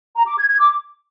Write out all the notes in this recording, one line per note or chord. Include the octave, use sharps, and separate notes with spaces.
A#5
D6
G#6
G#6
D6